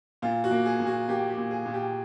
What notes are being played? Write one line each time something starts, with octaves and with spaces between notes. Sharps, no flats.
A#2 F4
F#4
A#3
G#4
A#2
F#4
A#3 G4
G4
A#2
G#4
A#2
G4